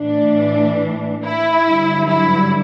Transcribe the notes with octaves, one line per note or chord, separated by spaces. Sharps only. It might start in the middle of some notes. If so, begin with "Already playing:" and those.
Already playing: A2 E3 D4
E4
G2 D3 F#3
E4